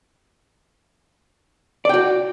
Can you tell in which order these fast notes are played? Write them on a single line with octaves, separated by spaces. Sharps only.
D5 G5 F#4